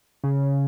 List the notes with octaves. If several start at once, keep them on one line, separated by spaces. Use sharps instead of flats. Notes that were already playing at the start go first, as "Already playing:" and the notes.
C#3